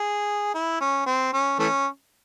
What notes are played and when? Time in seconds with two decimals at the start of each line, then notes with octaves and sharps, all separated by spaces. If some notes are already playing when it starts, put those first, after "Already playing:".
Already playing: G#4
0.54 E4
0.80 C#4
1.06 C4
1.33 C#4
1.59 E3 A3 C#4